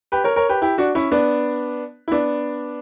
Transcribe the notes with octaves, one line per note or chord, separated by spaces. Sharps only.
G4 B4
A#4 C#5
A#4 C#5
G4 B4
E4 G4
D4 F#4
C#4 E4
B3 D4
E4
B3 D4